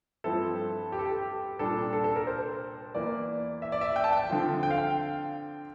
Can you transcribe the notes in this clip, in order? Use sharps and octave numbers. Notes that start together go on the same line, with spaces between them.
G2 F3 C4 E4 A4
G4
A4
G4
C2 A#2 G3 D4 A4
A4
A4
A#4
C5
E2 E3 A#3 E4 D5
E5
D5
E5
G5
A5
G5
D3 F3 C4 F4
G5
F5
G5